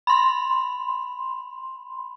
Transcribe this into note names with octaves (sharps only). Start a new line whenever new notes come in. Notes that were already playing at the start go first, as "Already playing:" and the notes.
B5 C6